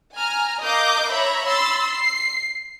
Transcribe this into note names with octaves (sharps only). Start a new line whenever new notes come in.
G#5 A#5 F6
A#4 D#5 F5 D6 G6
C#5 E5 A#5 B5
B5 C6 E6 A6
C7